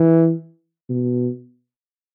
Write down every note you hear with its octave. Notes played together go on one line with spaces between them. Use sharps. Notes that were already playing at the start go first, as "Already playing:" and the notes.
Already playing: E3
B2